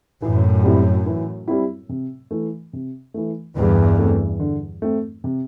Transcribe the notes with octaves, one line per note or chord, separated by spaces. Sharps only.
F#2 A2 E3
G3 C4 E4
E3
G3 C4 E4
C3
E3 A3
C3
E3 A3
E2 G2 D3
A3 C4
D3
A3 C4
C3